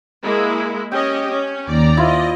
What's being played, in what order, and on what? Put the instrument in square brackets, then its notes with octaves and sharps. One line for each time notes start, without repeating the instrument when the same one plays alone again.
[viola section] G#3 A#3 E4
[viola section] C#4 G4 D#5 [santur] G5
[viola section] C#4
[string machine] D#2 A#5 [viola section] D5
[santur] E4 F4 C5 [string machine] D#5